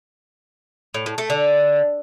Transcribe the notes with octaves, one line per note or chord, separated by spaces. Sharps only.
A2
A2
A3
D3